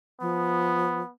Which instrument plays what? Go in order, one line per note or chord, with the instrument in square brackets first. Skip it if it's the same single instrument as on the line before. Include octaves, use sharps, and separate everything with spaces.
[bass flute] F3 [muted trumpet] B3